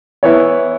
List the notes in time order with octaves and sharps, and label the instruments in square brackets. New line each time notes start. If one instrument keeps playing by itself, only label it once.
[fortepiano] E3 B3 E4 [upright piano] C#5